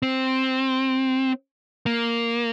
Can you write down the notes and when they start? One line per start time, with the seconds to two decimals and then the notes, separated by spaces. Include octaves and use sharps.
0.02 C4
1.86 A#3